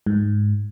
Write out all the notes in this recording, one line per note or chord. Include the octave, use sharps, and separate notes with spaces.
G#2